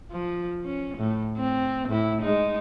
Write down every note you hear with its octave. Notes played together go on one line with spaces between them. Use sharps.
F3
C#4
A2
C4
A2 E4
G#3 D#4